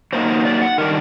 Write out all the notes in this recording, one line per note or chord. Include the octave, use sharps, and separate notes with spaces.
F#3 A#3 D#4 C5
C5
C5
D5
F#5
D#3 G3 D4 A#4